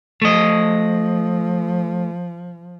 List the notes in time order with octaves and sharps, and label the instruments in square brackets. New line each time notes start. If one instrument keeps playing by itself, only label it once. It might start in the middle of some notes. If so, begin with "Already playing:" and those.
[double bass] F3 [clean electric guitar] A3 D#5